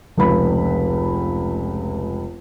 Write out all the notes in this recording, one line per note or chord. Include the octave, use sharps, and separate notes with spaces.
F1 C#2 B5